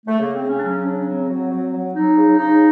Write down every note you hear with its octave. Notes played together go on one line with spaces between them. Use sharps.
A3
C#3 A#3
C4
C#3
C#4
D4
F#3 C#4
C#3 D4
F#3 C4
F#3
F#3
F#3
F#3 D#4
C#3
C#3 D#4